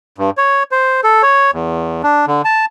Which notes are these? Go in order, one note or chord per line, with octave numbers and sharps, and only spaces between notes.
G2
C#5
C5
A4
C#5
E2
D4
D3
A5